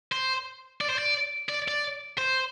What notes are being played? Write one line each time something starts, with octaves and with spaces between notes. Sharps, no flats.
C5
D5
C5
D5
D5
D5
C5